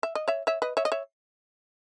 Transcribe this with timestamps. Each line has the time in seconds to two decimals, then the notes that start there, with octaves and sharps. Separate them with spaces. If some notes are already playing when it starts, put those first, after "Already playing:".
0.03 E5
0.15 D#5
0.28 C#5 E5
0.47 C#5 E5
0.62 B4 D#5
0.77 C#5 E5
0.85 D#5
0.92 C#5 E5